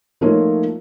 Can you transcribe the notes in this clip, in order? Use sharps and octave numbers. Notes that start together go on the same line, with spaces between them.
F3 A3 A#3 D#4 F4 C#5